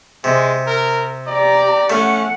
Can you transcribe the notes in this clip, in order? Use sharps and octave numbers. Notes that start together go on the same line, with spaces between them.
C3 G#3
A#4
G4 D5 A#5
A3 C#4 F#5